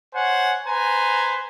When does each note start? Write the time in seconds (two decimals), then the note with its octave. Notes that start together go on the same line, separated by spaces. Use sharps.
0.14 C5 C#5 F#5 G#5
0.67 B4 C5 G#5 A#5